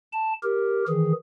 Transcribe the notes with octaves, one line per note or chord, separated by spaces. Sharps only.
A5
G4 A#4
D#3 E3 G#4